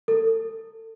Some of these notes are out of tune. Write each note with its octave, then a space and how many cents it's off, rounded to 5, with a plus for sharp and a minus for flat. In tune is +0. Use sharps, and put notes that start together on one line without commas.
A4 +30